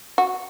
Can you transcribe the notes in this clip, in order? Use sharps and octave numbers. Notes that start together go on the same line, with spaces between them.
F#4